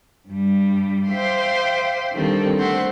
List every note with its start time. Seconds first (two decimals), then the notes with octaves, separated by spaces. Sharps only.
0.29 G2 G3
1.10 C5 E5 F5 G5 C6 D6
2.13 D3 D#3 G3 C4 A4
2.58 A3 C4 C5 F#5